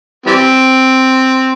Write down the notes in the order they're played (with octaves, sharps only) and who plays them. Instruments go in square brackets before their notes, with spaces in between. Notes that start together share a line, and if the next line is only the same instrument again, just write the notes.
[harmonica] E3 G3 C4